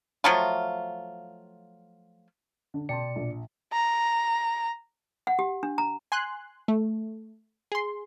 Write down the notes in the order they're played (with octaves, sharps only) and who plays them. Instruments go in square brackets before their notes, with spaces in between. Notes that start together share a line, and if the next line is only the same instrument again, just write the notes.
[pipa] F3 F#3 A3 F4
[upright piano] D3
[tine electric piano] B2 D5 C#7 [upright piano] G5 A5 C6
[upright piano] A#1
[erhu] A#5
[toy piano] F#5
G4
D4
A#5
[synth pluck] G#5 C6 F#6
A3
G#4 C6